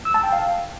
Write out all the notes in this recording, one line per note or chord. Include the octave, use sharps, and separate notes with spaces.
E6
A5
G5
F5